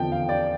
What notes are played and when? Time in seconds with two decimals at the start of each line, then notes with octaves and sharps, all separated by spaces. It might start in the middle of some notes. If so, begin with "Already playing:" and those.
Already playing: E2 D3 F3 G5 A5
0.12 F5
0.29 D5